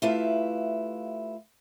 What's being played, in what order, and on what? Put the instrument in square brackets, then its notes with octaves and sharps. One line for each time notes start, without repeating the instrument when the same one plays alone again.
[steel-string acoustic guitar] A3 E4 F4 G4 B4 F5